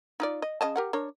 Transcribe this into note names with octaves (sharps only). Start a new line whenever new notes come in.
D#4 F4 D5
D#5
C#3 D#5 A5
G4 A#4 F#5
D4 A#4 C#5